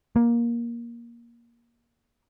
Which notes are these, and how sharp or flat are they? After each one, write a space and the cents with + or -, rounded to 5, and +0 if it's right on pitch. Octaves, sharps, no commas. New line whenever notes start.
A#3 +15